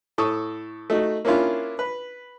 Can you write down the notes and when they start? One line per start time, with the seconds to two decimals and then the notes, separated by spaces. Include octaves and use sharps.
0.18 A2 A4 C#6 D#6
0.90 A3 D#4 F#4
1.25 A#3 C#4 D4 E4 F4
1.79 B4